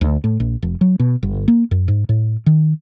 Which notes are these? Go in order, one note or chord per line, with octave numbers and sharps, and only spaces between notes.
D2
A2
A#1
F1
F#3
B2
G1
A#3
F#2
G#2
A2
D#3